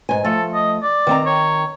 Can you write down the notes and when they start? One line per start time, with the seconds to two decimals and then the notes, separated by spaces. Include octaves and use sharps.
0.09 G#2 G#5
0.24 F3 A3 A4
0.54 D#5
0.83 D5
1.07 D#3 C4 A#5
1.26 C#5